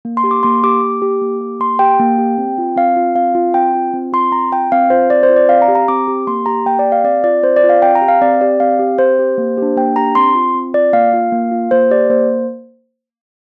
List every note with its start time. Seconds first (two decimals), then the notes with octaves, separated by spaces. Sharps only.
0.05 A#3
0.17 C6
0.24 G4
0.31 D6
0.43 A#3 C6
0.64 G4 D6
0.83 A#3
1.02 G4
1.22 A#3
1.41 G4
1.60 A#3 C6
1.79 G4 G5
1.99 A#3
2.18 G4
2.38 C4
2.58 F4
2.76 C4 F5
2.96 F4
3.15 C4 F5
3.35 F4
3.54 C4 G5
3.75 F4
3.93 C4
4.13 F4 C6
4.32 C4 A#5
4.52 F4 G5
4.72 C4 F5
4.90 F4 C5
5.10 C4 D5
5.23 C5
5.29 F4
5.36 D5
5.49 C4 F5
5.62 A#5
5.68 G4
5.75 A#5
5.88 C4 D6
6.08 G4
6.27 A#3 C6
6.46 G4 A#5
6.66 A#3 G5
6.79 D5
6.85 G4
6.92 F5
7.04 C4 D5
7.24 F4 D5
7.43 C4 C5
7.56 D5
7.64 F4
7.69 F5
7.82 C4 G5
7.95 A#5
8.01 G4
8.08 F5
8.21 C4 D5
8.41 G4 D5
8.60 C4 F5
8.79 G4
8.99 C4 C5
9.19 G4
9.38 A#3
9.58 D4 G4
9.76 A#3 G5
9.96 D4 G4 A#5
10.15 C4 C6
10.35 F4
10.55 C4
10.74 F4 D5
10.93 A#3 F5
11.13 F4
11.32 A#3
11.51 F4
11.71 A#3 C5
11.91 G4 D5
12.10 A#3 C5